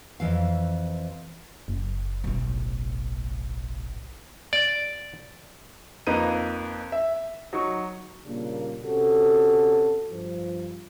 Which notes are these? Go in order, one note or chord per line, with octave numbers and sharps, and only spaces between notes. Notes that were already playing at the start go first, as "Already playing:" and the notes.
F2 E3 F5
F#1
B1 A2
D5
F2 A#3 D#4 B4 A#5 D#7
E5
F#3 D#4 C#6
A#2 C#3 G3 A#3 D4
C3 C#4 F#4 A4
G2 F3